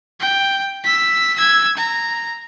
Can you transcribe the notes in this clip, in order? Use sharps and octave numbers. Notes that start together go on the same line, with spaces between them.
G5
E6 B6
E6 G#6
A#5